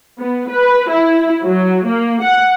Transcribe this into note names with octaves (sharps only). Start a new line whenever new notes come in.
B3
B4
E4
F#3
A#3
F#5